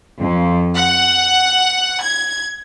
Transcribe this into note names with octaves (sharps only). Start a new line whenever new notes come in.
F2
F#5
G#6